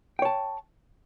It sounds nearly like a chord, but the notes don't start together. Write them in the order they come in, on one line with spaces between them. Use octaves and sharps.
G5 C#5 A5